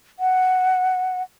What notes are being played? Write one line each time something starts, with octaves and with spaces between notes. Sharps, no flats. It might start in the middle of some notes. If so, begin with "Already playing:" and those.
F#5